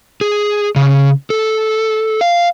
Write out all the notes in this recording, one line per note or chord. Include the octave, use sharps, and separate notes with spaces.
G#4
C#3
A4
F5